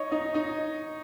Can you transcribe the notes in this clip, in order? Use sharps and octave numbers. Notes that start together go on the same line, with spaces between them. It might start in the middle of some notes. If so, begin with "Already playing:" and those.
Already playing: D#4 C#5 D#5
D#4 D#5
D#4 D#5